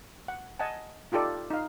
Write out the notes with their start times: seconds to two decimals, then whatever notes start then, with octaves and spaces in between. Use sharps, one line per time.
0.28 F#5
0.59 D#5 F#5 G#5 A5
1.12 D#4 F4 G4 A4 D5
1.50 D#4 F5